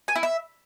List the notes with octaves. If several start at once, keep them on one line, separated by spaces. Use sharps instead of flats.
G#5
E4
E5